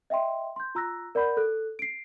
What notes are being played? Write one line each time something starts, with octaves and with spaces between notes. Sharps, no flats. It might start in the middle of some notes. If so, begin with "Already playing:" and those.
D#5 E5 G5 C6
C6 G6
F4 A#5 E6 F#6 A#6
A#4 D5 F#5 B5 G6
A4 F#6
C7 D7